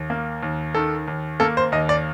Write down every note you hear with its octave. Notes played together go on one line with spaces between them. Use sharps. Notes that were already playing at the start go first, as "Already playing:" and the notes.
Already playing: D#2
A#3
D#2
D#3 A4
D#2
A#3 A4
C5
D#2 D#5
D5